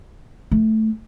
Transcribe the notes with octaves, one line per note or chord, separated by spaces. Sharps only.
A3